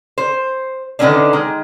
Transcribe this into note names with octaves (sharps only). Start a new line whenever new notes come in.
C5
D3 D#3 A3 B3 C#4 D4
D#3 G#3